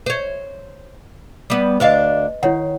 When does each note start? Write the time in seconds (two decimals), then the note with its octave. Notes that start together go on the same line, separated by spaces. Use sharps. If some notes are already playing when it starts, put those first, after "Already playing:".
0.06 C5 C#5
1.50 G3 B3
1.80 D2 D4 B4 D#5 F5
2.43 D#3 E4 C#5 F#5